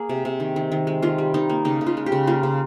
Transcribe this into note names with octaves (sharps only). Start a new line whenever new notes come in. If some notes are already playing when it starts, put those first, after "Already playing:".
Already playing: A#3 G#4
C3
C3
D#3
D#3
D#3
G#3
D#3 F4
G3
D#3 D#4
A#3
C#3 D#4
C#3
F4
G#3
G4
C#3
A#3 F4
C#3